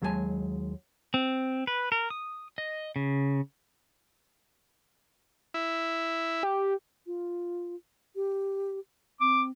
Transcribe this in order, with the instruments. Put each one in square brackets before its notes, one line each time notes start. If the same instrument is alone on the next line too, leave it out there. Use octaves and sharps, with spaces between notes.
[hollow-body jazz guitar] D#2 F#3 G#3 B3 G#5 A5
[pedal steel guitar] C4
B4
A#4
D#6
D#5
C#3
[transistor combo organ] E4
[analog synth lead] G4
[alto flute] F4
G4
[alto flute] C4 [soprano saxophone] D6